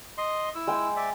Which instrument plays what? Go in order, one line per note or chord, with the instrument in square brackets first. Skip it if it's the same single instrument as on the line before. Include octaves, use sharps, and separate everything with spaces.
[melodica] D#5 C6
E4 E6
[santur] G#3 G5
[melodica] D5 E5